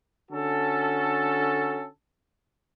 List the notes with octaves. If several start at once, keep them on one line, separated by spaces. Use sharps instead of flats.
D3 C#4 F#4 A4